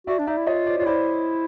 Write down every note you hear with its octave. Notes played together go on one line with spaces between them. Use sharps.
F#4 D5 E5
D4
D#4 D5 E5
E4
F4 C#5 D#5
C5 D5
F4 C#5
E4 C5 D5